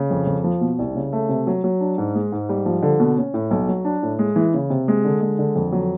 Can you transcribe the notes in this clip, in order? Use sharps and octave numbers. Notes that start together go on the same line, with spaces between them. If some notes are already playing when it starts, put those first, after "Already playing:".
Already playing: C#3
F2
F2
F3
B2
C2
C#3
A3
C3
F#3
F#3
D4
G#2
G#3
G#2
G3
F3
D3
B2
C#4
A2
B1
F#3
D4
A2
G#3
E3
C#3
C3
G#3
D3
G#3
D3
F2
F#3